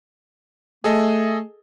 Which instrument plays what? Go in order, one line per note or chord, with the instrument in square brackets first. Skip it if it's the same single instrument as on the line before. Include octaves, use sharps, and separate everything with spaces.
[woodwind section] A3 [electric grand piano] G#4 A4 D#5